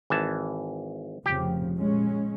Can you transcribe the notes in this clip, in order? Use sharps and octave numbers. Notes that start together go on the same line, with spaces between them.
G#1 E3 A5
F1 C#3 F3 G4
A#2 G#3 C#4